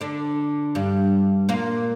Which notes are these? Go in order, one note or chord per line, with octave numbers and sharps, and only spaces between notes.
D3 D4
G2 G3
A#2 A#3